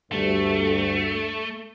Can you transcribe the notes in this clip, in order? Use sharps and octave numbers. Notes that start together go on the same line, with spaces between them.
D2 G2 A3